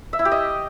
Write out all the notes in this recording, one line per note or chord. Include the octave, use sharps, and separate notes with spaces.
E5
E4
G4
D#5